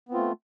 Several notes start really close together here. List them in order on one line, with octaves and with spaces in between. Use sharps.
B3 C4 F4 A3